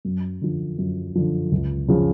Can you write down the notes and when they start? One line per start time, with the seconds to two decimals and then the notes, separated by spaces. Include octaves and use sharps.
0.05 F#2
0.41 D3 F3
0.78 F#2
1.15 D3 F3
1.52 C#2
1.88 C#3 F3 G#3